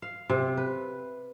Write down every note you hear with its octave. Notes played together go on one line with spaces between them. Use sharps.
F5
C3
B4